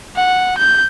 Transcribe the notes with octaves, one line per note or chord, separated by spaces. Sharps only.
F#5
G6